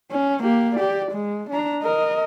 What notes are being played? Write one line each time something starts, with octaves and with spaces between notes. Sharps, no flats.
C#4
A#3 G4
G4 D5
G#3
D4 A#5
A#4 D#5